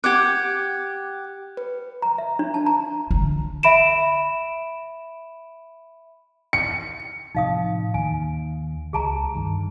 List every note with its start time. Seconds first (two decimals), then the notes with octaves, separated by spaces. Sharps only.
0.04 G4 F#5 D6 F#6 G#6
1.57 B4
2.02 A#5
2.18 E5
2.39 D4
2.54 A5
2.66 A#5
3.11 D3
3.63 E5 B5 D7 E7
6.53 C#7
7.35 A2 C3 F3 D#4 F5 D#6
7.94 D#2 D#3 G#5
8.93 C#2 G#4 A5 A#5
9.35 G2 D#3